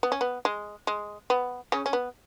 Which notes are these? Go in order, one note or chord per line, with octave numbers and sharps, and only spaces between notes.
B3
C#4
B3
G#3
G#3
B3
C#3 C#4
C#4
B3